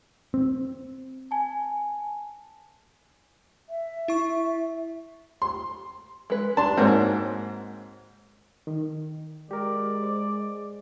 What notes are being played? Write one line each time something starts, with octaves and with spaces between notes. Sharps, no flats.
C4
G#5 A5
E5
E4 C#6
C6
G#3 B4
D4 A5 C6
G#2 A#3 C4 F#4 C#5
D#3
G#3 G4 A#4 D5
C5 D6